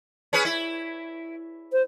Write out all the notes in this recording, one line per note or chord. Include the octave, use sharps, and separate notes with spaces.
C#4 G#4 B4
E4
C5